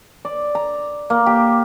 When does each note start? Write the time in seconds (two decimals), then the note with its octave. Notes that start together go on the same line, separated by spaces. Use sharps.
0.25 D5
0.55 A#5
1.10 A#3
1.26 G4